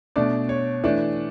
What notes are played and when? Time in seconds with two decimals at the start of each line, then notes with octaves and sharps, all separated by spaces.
0.16 B2 A3 D4 D5
0.49 C#5
0.84 E3 A3 D4 D5